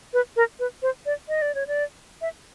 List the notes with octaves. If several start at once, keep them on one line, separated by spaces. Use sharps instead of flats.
B4
A#4
B4
C5
D5
D#5
D5
C#5
D5
E5